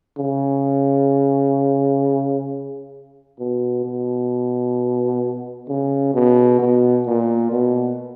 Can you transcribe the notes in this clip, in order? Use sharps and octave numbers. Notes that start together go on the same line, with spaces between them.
C#3
B2
B2
C#3
B2
B2
A#2
B2